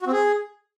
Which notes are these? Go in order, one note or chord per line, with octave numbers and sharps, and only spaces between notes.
F#4
C4
G#4